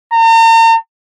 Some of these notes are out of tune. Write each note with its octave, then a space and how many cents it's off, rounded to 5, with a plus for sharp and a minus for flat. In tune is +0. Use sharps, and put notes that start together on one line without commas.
A#5 -40